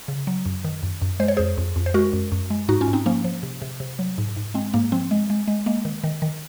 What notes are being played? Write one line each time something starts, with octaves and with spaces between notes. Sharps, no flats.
C#3
F#3
F#2
D#3
F#2
F#2
G#3 C5
C#5
F2 G#4 C5
F2
F2
C5
G#3 F#4 A#4
F#2
F#2
G#3
G#2 D#4 F#4
C#4 F4
G#2
C4 D#4
F3 A#3 C#4
F3
C3
C3
C3
F#3
G#2
G#2
G#3 C4
G#2 A#3
F3 C4
G#3
G#3
G#3
G#3 A#3
D#3
D#3
D#3